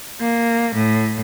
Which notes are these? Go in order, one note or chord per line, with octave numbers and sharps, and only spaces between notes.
A#3
A2